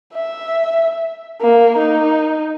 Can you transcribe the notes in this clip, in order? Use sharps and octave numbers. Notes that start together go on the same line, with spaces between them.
E5
A#3
D#4